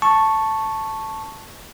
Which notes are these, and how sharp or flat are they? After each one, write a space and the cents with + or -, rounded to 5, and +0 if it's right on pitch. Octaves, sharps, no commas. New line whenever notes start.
A5 +0 C#6 -5